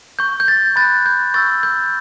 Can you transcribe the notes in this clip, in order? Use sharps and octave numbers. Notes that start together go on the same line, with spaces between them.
C#6 G6
G6
A6
B5 F#6 A6
G6
C#6 E6 G6 A6
G6